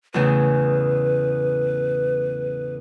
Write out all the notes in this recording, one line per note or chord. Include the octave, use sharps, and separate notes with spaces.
E2 A2 C#3 B4